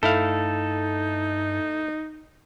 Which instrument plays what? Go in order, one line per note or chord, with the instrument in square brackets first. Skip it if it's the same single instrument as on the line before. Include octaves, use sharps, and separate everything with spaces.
[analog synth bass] G2 [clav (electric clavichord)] A3 E4 F5 [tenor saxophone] D#4 [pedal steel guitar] A4